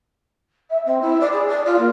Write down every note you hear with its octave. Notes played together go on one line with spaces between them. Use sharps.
E5
C4
E4
D5
G#4
D5
F4
A#3